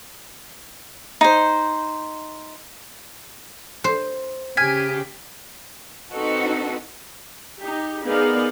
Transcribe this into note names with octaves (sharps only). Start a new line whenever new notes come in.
D#4 C5
C5
C#3 G4 G#5 F6 G#6 B6
C4 D#4 F#4 A4 B4
D#4 G4
B3 D#4 G#4 A#4 D5 F5